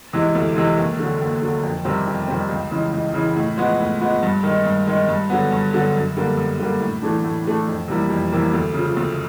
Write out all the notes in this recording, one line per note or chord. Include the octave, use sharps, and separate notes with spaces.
C3 E3 G#3
D2
C3 E3 G#3
D#2
D3 F#3
D#2
D3 F#3
F2
C3 D#3 G3 C4
F2
C3 D#3 G3 C4
C#2
C#3 E3 G#3
C#2
C#3 E3 G#3
A2
F3 G#3 B3
A2
F3 G#3 B3
G2
D#3 G#3
G2
D#3 G#3
G2
D3 F#3 B3
G2
D3 F#3 B3
F#2
D3 G3 A#3
F#2
D3 G3 A#3
A2
E3 A3 D4
A2
E3 A3 D4
F2
C3 E3 G3 A#3
F2
C3 E3 G3 A#3
D2
C#3 F3
D2